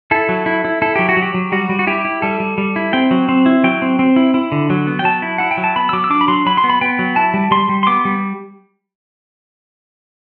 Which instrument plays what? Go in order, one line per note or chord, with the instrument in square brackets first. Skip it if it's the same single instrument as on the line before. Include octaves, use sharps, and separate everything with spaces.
[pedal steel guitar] E4 A4
F#3
E4
E4
E4 A4
F#3 G4
F#4
F#3
G4
F#3
G3 F#4
G3
F#4
E4 G4
E4
G3 A4
G3
G3
E4
C4 G5
F#3
C4
E4
F#3 G5
C4
C4
E4
E4
D3
F#3
B3
G5
F#3 A5
E4
E4 F#5
G5
F#3
A5
B3 B5
E6
F#3 D6
E6
D4 D6
B5
F#3 C6
F#3 B5
C6
B3
B5
B3 G5
F#3
E4 A5
G3
G3 C6
G3
C6
B3 D6
G3